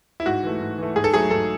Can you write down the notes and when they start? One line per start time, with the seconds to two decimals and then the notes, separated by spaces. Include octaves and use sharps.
0.20 E4
0.26 G#2 F#4
0.43 E3 A3
0.61 G#2
0.78 E3 A3
0.96 G#2 G#4
1.04 A4
1.14 F#3 A3 G#4
1.30 G#2 A4